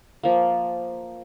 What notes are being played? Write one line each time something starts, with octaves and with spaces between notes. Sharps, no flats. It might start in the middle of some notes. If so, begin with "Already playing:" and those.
F3 A#3